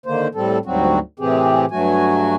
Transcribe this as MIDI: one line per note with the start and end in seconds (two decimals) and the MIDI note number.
0.06 0.28 50
0.06 0.28 51
0.06 0.28 58
0.06 0.28 72
0.35 0.59 45
0.35 0.59 55
0.35 0.59 60
0.35 0.59 69
0.66 0.99 38
0.66 0.99 44
0.66 0.99 54
0.66 0.99 55
0.66 0.99 60
0.66 0.99 66
1.20 1.65 45
1.20 1.65 48
1.20 1.65 52
1.20 1.65 60
1.20 1.65 67
1.20 1.65 68
1.71 2.36 43
1.71 2.36 54
1.71 2.36 57
1.71 2.36 66
1.71 2.36 80